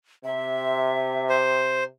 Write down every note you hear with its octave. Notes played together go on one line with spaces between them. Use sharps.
C3 E5
C5